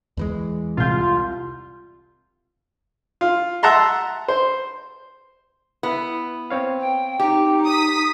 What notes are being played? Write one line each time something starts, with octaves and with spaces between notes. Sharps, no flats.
E2 E3 G#3
C2 F4 G6
F4
E5 F#5 A5 A#5 C6
C5
B3 E4 B4
C4 C#5 F5
G5
D#4 G4
D#6 B6